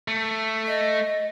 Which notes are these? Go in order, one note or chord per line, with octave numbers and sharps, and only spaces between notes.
A3
D#5